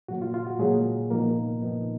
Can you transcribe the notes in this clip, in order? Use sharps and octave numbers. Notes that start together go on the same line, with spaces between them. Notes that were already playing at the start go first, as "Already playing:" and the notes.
A#2 F#3 A#3 F#4
F4
F4
F#4
A#2 F#3 G#3 A#3 G#4
A#2 F3 A#3 B3 D#4 A#4
A#2 F3 B3 D#4